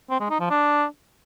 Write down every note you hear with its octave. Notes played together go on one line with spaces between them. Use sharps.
C4
G#3
D#4
F3
D4